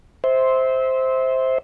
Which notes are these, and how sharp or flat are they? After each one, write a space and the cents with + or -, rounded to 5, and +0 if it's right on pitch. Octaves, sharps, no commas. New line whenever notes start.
C5 +0 E5 -25